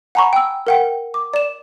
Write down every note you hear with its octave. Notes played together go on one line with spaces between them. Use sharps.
F#5 G#5 A#5 B5 C#6
G5 E6
A#4 F#5 G5
D6
D5 E7